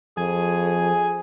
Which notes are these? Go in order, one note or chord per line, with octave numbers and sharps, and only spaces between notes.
F2 F3 G#4 G#5